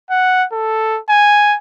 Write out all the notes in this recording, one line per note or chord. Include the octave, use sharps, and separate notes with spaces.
F#5
A4
G#5